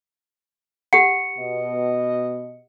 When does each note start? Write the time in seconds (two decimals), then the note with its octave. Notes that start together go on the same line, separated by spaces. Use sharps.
0.93 G4 F#5 C#7
1.39 B2 D#5